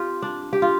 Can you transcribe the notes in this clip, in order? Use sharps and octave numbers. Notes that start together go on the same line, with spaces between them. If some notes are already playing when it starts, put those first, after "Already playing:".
Already playing: C4 F4 G4
D4
G4
F4